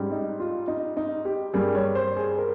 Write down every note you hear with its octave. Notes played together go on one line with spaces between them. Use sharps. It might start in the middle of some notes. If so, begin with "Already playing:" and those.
Already playing: G#2 G3 C#4
D#4
F4
D#4
D#4
G4
G2 G3 A#3 G#4
C#5
C5
G#4
A#4